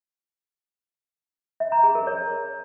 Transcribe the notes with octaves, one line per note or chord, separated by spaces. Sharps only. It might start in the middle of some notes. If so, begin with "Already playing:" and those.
E5
A#5
G#4
A#4
C#5